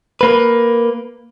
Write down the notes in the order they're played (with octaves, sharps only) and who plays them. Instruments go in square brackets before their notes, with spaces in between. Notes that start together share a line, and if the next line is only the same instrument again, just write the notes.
[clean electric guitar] A#3 B4